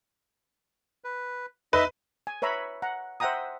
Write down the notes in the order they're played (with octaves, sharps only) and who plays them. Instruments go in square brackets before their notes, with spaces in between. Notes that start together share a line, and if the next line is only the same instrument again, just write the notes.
[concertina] B4
[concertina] D#4 D#5 E5 [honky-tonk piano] B4
[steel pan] G#5
B4 C#5 E5 A#5 B5
F#5 A#5
C5 E5 F#5 G5 A#5 D#6